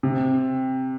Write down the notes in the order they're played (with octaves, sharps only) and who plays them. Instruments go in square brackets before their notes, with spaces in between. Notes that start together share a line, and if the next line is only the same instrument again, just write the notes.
[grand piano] C3